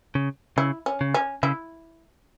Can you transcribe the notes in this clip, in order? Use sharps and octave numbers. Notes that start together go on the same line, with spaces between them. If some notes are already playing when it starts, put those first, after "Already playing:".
C#3
C#3 E4
C#4
C#3
C#4
C#3 E4